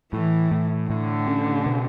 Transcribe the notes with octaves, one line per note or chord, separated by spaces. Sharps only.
A2 E3
A2
A2 D3
C#4
B2